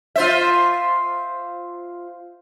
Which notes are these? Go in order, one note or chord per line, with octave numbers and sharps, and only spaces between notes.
F4 C5 E5